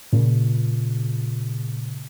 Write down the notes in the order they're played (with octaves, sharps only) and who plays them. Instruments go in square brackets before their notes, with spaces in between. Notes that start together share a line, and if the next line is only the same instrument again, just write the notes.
[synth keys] A#2 C#3